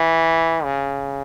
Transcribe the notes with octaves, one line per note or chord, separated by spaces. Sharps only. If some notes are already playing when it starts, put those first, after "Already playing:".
Already playing: E3
C#3